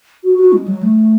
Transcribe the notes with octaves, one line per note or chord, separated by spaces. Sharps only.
F#4
F#4
G#3
F#3
A3